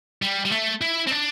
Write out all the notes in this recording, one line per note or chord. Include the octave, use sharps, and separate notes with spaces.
G3
G3
A3
E4
C4
D4